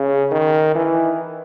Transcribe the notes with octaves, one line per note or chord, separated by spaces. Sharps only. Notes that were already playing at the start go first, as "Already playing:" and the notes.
Already playing: C#3
D#3
E3